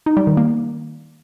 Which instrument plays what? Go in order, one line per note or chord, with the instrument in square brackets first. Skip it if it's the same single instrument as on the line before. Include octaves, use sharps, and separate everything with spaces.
[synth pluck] D#4
G3
D#3
A#3